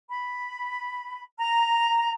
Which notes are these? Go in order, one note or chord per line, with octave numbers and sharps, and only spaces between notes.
B5
A#5